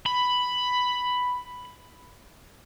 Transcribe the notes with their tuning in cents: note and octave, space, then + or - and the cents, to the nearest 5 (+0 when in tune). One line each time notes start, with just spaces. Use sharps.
B5 +5